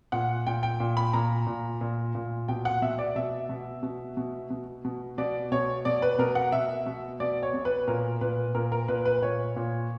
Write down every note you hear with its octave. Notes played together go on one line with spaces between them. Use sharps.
A#2 F#5
A#2 G5
G5
A#2
B5
A#2 A#5
A#2
A#2
A#2
B2 G5
F#5
B2 E5
D5
B2 E5
B2
B2
B2
B2
B2
B2 D5
B2 C#5
B2 D5
B4
B2 A#4
F#5
B2 E5
B2
B2 D5
C#5
B2
B4
A#2 A#4
A#2 B4
A#2 A#4
A#4
A#2 B4
B4
A#2 C#5
A#2